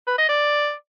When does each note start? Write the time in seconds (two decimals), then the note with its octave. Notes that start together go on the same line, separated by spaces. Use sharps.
0.07 B4
0.18 D#5
0.29 D5